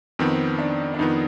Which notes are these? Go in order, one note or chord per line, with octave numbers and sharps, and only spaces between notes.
F2 D#3 B3 C4
D4
D4
F2 D#3 B3 D#4